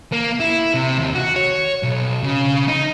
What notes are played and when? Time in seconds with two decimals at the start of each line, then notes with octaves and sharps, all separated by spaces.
0.13 A#3
0.40 E4
0.74 C3
0.98 D#2
1.15 F#4
1.36 C#5
1.83 B1
2.23 C#3
2.68 D#4